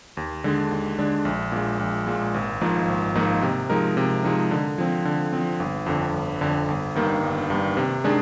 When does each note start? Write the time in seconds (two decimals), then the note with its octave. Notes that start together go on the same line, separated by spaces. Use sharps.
0.17 D#2
0.44 D3 G#3 D4
0.71 D#2
0.99 D3 G#3 D4
1.25 A#1
1.52 A#2 G#3
1.79 A#1
2.07 A#2 G#3
2.34 G#1
2.61 G#2 F3 A#3 D#4
2.88 G#1
3.15 G#2 F3 A#3 D#4
3.42 C3
3.70 F3 G#3 D#4 A#4
3.97 C3
4.24 F3 G#3 D#4 A#4
4.51 D3
4.78 F3 C4
5.05 D3
5.32 F3 C4
5.60 G1
5.86 F2 D3
6.14 G1
6.41 F2 D3
6.68 G1
6.95 G2 D#3 A#3
7.22 G1
7.50 G2 D#3 A#3
7.77 C3
8.04 D#3 G#3 D4 G#4